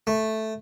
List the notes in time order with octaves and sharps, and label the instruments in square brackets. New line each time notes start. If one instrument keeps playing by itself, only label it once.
[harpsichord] A3